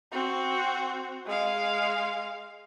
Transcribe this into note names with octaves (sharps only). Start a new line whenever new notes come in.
C4 F#4
G#3 F5